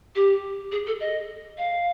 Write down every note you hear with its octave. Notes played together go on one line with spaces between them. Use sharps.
G4
G#4
A4
D#5
F5